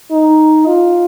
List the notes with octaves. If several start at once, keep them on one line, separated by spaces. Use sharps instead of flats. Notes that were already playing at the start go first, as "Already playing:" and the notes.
D#4
F4